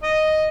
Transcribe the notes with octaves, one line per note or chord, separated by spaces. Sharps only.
D#5